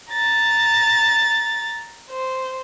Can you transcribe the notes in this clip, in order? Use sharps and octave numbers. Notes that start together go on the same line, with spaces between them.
A#5 A6
C5